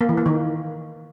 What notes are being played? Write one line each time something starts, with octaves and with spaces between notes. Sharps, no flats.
A#3
E3
A#3
D#3